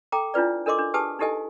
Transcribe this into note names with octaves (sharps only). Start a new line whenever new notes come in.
A4 G5 A#5 D6
D4 E4 F4 B4 D5
D4 A4 A#4 D#5 C6 D6
D4
G4 G#4 B4 G#5 A5 D#6
D#4 E4 G4 A4 D#5 G#5